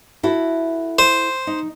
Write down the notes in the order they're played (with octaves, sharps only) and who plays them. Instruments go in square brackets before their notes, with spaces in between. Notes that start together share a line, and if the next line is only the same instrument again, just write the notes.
[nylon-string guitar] E4 F#4 A4
[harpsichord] C5
[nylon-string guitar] D#4